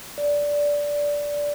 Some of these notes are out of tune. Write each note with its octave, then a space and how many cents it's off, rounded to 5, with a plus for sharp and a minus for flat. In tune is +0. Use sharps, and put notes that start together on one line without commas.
D5 -10